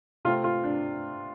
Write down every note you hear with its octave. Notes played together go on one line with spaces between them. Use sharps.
C3 A3 C4 F4
F4
D4